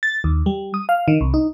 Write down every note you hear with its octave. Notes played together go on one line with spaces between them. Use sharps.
A6
D#2
G3
D#6
F5
D#3
C2
D#4